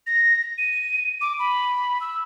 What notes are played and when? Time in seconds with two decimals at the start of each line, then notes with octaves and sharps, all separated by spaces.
0.07 A#6
0.58 D#7
1.21 D6
1.39 B5
2.01 E6